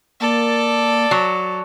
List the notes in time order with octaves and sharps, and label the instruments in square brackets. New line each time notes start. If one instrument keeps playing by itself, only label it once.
[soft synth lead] A#3 [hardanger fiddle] A4 D5
[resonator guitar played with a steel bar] F#3